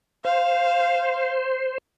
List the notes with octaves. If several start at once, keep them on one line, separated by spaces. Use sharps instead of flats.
C5 F5